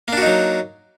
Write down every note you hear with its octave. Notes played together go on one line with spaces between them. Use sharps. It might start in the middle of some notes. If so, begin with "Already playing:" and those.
F#3 A#3 D4 D#4 F#4